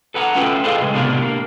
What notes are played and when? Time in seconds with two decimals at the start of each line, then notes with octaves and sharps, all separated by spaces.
0.14 A4 B4 F#5 A#5
0.35 A3 C#4 F4 A4 B4 G5
0.64 G#4 A4 B4 C5 D#5 F5
0.80 A2 C#3 G#3
0.93 A2 C3 B3 D4 G4 A#4
1.22 A#3